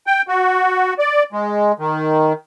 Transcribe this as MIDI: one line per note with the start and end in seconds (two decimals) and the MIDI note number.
0.07 0.22 79
0.28 0.94 66
0.99 1.23 74
1.33 1.72 56
1.79 2.33 51